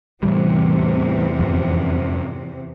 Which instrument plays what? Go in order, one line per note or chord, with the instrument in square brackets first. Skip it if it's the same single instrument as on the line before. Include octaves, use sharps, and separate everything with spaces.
[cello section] E2 C3 [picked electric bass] A2 E3 G3
[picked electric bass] F2 G#2 F3